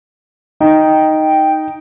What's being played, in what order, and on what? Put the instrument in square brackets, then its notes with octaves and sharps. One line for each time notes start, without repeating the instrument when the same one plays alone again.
[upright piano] D#4 [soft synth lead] G5